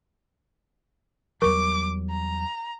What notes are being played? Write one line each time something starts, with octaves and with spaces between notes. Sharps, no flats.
E2 F#3 G3 A#4 C#6 D6
A#5